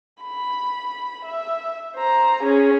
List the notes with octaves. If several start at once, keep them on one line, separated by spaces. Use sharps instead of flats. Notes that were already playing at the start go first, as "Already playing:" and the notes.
B5
E5
C5 A#5
C#4 G#4